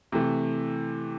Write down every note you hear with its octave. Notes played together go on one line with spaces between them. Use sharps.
C3 E3 A3